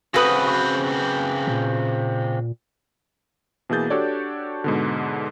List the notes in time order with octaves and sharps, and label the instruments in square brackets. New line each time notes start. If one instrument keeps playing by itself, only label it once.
[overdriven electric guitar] C#3 C4 [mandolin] F#4 B4 D#6
[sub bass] A#2
[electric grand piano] B2 E3 A#3 G#4 G6 A6
D4 F#4 G4 A4 C#5 D5
G#2 B2 D3